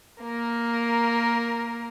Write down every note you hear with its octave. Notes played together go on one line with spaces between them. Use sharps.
A#3 A#4